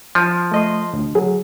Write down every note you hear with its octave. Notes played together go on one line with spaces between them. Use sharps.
F3
A3 D#5 C6
D2
F#3 G#4